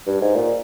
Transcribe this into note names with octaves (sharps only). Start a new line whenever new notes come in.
G2
G#2
A#2